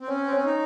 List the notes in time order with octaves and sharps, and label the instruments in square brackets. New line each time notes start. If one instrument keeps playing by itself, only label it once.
[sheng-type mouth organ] C4
[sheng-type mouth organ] C#4 [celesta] C#5
[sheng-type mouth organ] C4
[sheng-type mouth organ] C#4 [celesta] C#5
[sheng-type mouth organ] D#4